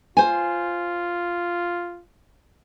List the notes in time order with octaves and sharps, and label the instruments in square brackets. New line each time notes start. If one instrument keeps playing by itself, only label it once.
[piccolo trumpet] F4 [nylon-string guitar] C5 G#5